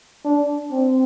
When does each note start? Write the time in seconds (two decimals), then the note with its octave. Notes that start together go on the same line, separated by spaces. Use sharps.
0.25 D4
0.71 C4